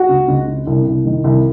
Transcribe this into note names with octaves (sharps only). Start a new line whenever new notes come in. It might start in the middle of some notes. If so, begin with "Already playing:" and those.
Already playing: F#4
C#2
C#2
C#3
C2
C2
D#3
C2